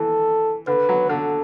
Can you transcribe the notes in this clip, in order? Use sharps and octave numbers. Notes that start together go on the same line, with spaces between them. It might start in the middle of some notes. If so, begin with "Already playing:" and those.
Already playing: E3 A4
D3 B4
F#3
D3 A4